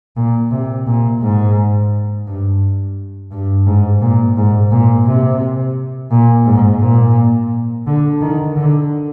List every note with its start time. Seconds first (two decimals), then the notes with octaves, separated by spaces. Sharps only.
0.17 A#2
0.51 C3
0.87 A#2
1.22 G#2
2.27 G2
3.32 G2
3.67 G#2
4.02 A#2
4.37 G#2
4.71 A#2
5.06 C3
6.11 A#2
6.46 G#2
6.81 A#2
7.87 D3
8.21 D#3
8.56 D3